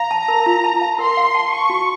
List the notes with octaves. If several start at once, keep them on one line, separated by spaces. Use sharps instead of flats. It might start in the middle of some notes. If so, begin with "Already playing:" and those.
Already playing: F5 A#5
A5
A#4
F4
A5
F5
A#4 C6
F5
A5
A5 C#6
F#4